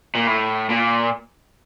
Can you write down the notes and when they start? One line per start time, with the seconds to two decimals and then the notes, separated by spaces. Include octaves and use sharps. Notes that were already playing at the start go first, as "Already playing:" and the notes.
0.15 A#2
0.27 A2
0.70 A#2